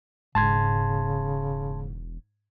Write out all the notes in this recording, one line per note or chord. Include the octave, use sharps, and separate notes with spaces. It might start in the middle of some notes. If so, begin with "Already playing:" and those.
E1 G#2 C#3 A5 C6 G#6